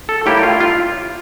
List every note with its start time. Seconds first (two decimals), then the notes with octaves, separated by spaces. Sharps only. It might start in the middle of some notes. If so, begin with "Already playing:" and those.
0.09 A4
0.26 A2 G3 A#3 E4 G4
0.43 F4
0.60 F4